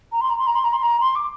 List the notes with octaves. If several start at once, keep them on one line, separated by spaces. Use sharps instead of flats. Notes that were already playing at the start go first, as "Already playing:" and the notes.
A#5
C6
A#5
C6
A#5
C6
A#5
C6
A#5
C6
D6